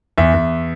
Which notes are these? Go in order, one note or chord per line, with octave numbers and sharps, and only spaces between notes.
E2 E5
E2